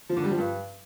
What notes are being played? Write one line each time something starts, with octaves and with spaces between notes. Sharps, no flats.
F3
D3
G3
F3
G2